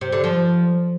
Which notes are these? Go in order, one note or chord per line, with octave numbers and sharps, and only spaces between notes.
C3
D3
F3